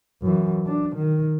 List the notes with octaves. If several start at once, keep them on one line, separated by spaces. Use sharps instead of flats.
F#2 E3
D4
D#3